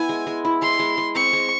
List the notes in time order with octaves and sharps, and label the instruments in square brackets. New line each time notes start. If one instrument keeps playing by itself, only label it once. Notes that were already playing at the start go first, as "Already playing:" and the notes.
Already playing: [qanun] B3 E4 [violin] G#5
[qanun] G#3
G#3
E4
[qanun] G#3 [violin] C6
[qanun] G#3
G#3
[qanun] C4 [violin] C#6
[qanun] G#3